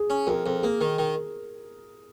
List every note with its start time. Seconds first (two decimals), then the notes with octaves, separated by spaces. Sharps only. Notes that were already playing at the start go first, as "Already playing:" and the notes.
Already playing: G#4
0.10 C#4
0.27 F2 A#4
0.46 F2
0.62 A#3 G#4
0.81 D#3
0.99 D#3